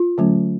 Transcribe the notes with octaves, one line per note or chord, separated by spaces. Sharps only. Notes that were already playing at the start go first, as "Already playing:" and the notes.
Already playing: F4
D3 F#3 A3 C#4